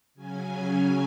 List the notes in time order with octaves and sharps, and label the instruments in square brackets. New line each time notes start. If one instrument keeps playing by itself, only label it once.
[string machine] C#3 F#3 C#4 G#5